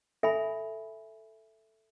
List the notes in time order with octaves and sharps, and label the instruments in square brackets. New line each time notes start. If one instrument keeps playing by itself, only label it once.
[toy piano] A4 E5 G#5 B5